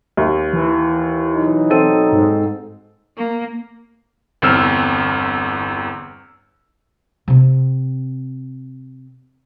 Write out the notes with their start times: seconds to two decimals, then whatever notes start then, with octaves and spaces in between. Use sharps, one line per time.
0.17 D#2
0.53 E3
1.35 B2 F#3 D#4
1.70 C4 A4 D#7
2.13 G#2
3.17 A#3
4.42 G1 E2 C4 E6 F6
7.28 C3 C4